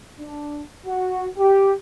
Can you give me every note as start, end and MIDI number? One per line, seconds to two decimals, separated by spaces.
0.20 0.61 62
0.87 1.26 66
1.38 1.71 67